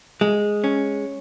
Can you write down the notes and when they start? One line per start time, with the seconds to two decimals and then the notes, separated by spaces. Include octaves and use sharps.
0.21 G#3
0.64 C#4